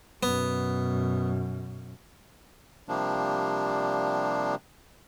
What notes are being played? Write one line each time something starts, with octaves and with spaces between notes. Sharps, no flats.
F#2 B2 B3
C3 F3 G3 A#3 D4